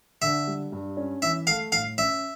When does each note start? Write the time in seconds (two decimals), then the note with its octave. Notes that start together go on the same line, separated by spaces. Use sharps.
0.22 D3 E5
0.47 G3
0.72 G2
0.97 C#4
1.22 E3 E5
1.47 A3 F5
1.72 A2 F5
1.98 C#4 E5